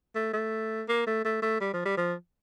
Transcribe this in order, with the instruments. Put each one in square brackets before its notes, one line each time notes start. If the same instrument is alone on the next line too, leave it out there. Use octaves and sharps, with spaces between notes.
[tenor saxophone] A3
A3
A#3
A3
A3
A3
G3
F3
G3
F3